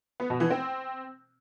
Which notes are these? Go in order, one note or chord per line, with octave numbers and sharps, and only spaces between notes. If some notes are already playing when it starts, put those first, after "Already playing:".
B3
B2
E3
C4